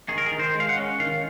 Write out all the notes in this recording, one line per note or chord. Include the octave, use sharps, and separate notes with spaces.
D#3 G#4
A#4
G#4
D#3
C5
G#3
F5
F#5
C#4
D#3 F5